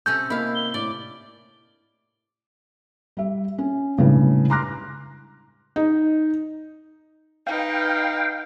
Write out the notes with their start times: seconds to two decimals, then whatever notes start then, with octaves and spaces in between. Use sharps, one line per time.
0.06 C3 C#4 A4 G6
0.30 A#3 E4 D#5 F5 B5
0.55 G7
0.74 A2 D5 D6
3.17 G3 E5
3.58 C#4
3.98 A2 C#3 G3 G#3 B3 D4
4.50 A#5 C6 D6 F6 F#6 A#6
5.76 D#4
7.47 D#4 B4 F5 G5